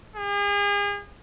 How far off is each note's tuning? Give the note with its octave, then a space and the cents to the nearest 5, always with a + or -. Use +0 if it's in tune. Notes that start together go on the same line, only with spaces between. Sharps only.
G#4 -40